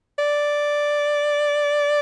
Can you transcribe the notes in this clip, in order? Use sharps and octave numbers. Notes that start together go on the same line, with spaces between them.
D5